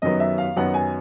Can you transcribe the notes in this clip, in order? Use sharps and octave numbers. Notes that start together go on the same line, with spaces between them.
F#2 D#3 F#3 B3 D#5
E5
F5
F#2 D#3 F#3 B3 F#5
G#5